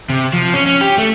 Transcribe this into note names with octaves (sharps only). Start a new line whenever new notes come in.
C3
F3
C#4
C#4
G4
A3